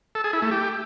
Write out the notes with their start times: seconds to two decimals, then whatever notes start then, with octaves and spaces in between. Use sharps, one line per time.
0.15 A4
0.24 G#4
0.33 E4
0.42 A3
0.51 G4